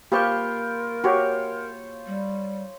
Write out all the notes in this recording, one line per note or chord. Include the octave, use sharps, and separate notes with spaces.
A#3 F4 G4 A#4 C5 B5 C#6 G6
F#4 G4 C5 C#5
G3